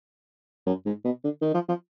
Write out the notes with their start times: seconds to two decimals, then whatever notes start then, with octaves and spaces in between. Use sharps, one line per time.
0.67 F#2
0.86 G#2
1.05 B2
1.24 D3
1.42 D#3
1.54 F3
1.69 F3